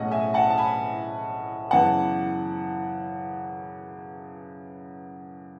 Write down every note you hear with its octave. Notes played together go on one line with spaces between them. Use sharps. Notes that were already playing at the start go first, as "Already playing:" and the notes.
Already playing: B1 A2 G#3 C#4 D#5 F#5
E5 G#5
F#5 A5
A5
G#5 B5
F#2 C#3 E3 B3 F#5 A5